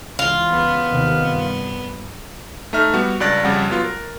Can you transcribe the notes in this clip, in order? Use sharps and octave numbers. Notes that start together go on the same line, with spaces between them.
C#2 E3 F4
C#2 B3
D#2 C3 D#3
G2
A3 D#4 E5 F6
G3 B3 F#4
C#2 G2 D5 F#6 A6 A#6
F2 C#3 G3 F#5
F#3 B3 F4
A#4